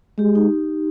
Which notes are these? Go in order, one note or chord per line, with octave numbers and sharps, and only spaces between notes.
G#3 G4
D#4